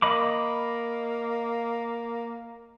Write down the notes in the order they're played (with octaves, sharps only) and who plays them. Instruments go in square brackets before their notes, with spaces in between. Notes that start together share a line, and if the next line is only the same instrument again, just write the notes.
[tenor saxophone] A#3 [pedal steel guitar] D#5 B5 D6